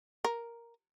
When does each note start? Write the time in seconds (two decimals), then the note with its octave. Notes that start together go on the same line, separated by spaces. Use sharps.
0.25 A#4